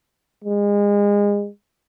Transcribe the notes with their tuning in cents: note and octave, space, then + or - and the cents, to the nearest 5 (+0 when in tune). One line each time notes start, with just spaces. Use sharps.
G#3 -30